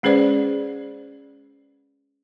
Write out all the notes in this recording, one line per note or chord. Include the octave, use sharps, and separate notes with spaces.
G#3 C#4 G#4 B4 C5 D5